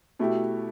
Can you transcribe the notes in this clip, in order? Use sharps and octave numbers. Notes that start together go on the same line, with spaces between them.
B2 A3 E4 G4